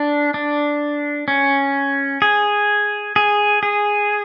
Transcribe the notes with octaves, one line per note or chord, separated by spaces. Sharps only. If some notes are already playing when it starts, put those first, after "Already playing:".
Already playing: D4
D4
C#4
G#4
G#4
G#4